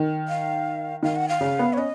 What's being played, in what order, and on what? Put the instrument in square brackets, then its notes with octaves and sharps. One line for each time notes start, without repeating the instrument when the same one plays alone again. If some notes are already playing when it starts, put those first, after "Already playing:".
Already playing: [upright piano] D#3
[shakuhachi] F5
[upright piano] D#3 [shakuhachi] F5
[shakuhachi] F#5
F5
[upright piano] C#3
B3
[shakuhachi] C#5
[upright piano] C#4 [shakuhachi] D#5